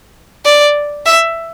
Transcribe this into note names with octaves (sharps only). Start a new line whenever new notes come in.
D5
E5